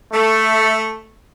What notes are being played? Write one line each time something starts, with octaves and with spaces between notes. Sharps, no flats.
A3